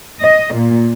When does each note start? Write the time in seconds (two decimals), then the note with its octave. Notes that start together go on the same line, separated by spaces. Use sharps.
0.22 D#5
0.55 A#2